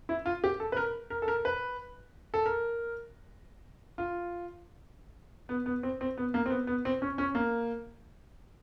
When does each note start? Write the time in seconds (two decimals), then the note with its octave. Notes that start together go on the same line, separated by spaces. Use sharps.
0.09 E4
0.26 F4
0.44 G4
0.60 A4
0.72 B4
0.77 A#4
1.10 A#4
1.22 A4
1.28 A#4
1.45 B4
2.34 A4
2.46 A#4
3.98 F4
5.49 B3
5.66 B3
5.83 C4
6.01 C4
6.18 B3
6.34 A#3
6.46 C4
6.50 B3
6.67 B3
6.85 C4
7.02 C#4
7.18 C#4
7.35 A#3